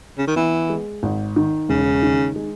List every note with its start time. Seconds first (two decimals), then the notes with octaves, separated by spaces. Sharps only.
0.18 C#3
0.27 D#3
0.36 E3 B3
0.70 G#3
1.03 G#1
1.36 D#3
1.69 E1 C#3
2.03 D#3
2.36 G#3